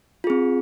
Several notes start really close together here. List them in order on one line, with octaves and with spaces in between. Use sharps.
F4 G#4 C4